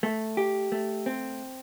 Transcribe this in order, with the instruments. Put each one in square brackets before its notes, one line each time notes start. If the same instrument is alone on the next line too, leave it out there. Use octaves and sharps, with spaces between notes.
[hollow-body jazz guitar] A3
G4
A3
C4